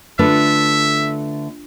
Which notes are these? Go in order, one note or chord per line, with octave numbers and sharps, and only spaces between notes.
D3 A3 D4 F4 B4 E5